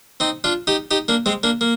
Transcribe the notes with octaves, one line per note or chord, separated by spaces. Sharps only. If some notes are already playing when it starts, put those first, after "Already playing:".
C4 D#4
D4 F4
D#4 G4
D#4 G4
A#3 D4
G#3 C4
A#3 D4
A#3